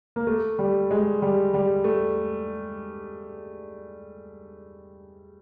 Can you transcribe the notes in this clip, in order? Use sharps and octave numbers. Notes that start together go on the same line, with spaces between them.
A#3
A3
G3
G#3
G3
G3
A3